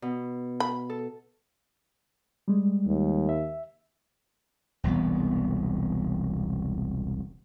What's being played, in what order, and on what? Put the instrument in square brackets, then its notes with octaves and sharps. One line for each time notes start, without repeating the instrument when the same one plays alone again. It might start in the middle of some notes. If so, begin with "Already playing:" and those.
[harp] B2
[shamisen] B5
[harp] A4
[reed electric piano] G3 G#3
[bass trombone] D#2
[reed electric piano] E5
[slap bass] E1 C2 E3 B3